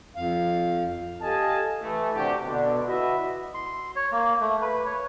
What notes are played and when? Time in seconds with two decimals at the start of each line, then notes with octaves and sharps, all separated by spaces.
0.16 F2 F5
1.21 G4 A4 D#5 F5 G#5 A5
1.82 E3 A3
2.14 C3 D4 F#4 G4
2.45 B2 D3 D4
2.86 E4 F#4 B4 D#5 E5
3.54 C6
3.96 C#5
4.12 A#3
4.40 A3
4.62 B4
4.86 C#5